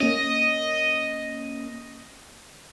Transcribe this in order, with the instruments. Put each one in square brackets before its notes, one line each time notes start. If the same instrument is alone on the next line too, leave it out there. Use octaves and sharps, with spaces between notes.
[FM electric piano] A#3 C#4 [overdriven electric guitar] D#5